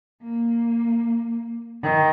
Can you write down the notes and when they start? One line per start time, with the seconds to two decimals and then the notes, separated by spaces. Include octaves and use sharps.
0.23 A#3
1.83 D#3